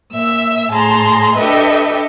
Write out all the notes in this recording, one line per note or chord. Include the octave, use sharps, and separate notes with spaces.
A#2 E5 E6
A2 G#4 A5 A#5 C6
D4 G4 A4 B4 D#5 E5